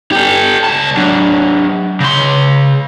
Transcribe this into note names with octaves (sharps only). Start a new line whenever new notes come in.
G4 A4
C#2 A5
F#3 D4
C#3 C6